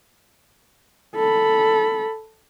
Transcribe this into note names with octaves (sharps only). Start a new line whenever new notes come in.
A4 B5